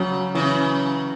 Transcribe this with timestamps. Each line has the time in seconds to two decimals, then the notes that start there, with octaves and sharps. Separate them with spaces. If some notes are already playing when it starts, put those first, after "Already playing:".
Already playing: C#3 F#3
0.35 C#3 E3